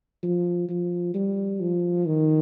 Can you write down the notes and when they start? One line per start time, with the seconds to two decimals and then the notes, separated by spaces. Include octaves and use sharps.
0.23 F3
0.69 F3
1.15 G3
1.60 F3
2.06 D#3